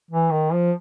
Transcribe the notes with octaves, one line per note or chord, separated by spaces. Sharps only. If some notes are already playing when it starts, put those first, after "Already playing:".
E3
D#3
F3